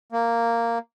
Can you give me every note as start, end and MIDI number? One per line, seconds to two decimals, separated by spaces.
0.12 0.79 58